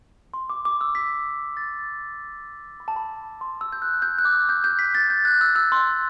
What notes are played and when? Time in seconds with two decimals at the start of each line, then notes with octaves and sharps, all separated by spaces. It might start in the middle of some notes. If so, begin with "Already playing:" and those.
0.34 C6
0.50 D6
0.65 D6
0.81 E6
0.95 B6
1.57 A6
2.80 B5
2.88 A5
2.96 B5
3.41 C6
3.61 E6
3.72 G6
3.82 F#6
4.02 G6
4.18 F#6
4.25 D6
4.33 E6
4.49 G6
4.64 G6
4.79 B6
4.95 A6
5.10 G6
5.25 F#6
5.41 E6
5.56 E6
5.72 C6